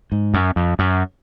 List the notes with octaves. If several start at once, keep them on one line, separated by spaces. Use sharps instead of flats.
G#2
F#2
F2
F#2